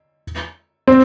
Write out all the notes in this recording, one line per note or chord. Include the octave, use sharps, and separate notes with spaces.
C4